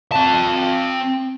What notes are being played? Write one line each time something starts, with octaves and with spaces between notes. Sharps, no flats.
C4 A5